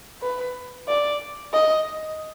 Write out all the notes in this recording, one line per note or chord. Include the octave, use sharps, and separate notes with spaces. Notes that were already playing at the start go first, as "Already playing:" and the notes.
B4
D5
D#5